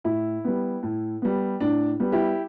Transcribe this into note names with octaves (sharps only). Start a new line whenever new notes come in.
A2 E4
G3 B3
A2
G3 B3
A2 D4
G3 B3
E4 G4